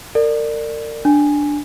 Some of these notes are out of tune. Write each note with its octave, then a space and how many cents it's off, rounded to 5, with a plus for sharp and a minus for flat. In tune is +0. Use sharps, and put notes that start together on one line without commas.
A#4 -35 D5 +15
D4 +0 G#5 +0